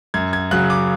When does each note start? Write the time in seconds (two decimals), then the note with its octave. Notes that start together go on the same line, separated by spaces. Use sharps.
0.14 F#2 G#6
0.33 G#6
0.51 C#3 F#3 F#6
0.70 D6